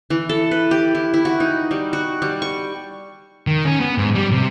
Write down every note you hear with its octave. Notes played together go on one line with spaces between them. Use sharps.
E3
A4
B4
G4
E4
E4
F#4
D#4
G3
F#4
G3
C#6
D#3
C#4
B3
G#2
G3
C3